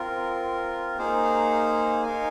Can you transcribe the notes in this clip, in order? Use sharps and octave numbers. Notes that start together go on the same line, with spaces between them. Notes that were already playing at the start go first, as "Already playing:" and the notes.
Already playing: C4 F4 A#4
A#3 D#4 G#4 C5 F5
D#4 A#4 F5 G#5